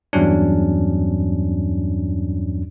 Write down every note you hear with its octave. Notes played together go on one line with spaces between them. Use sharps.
E2 G2 F#3 C#4 D4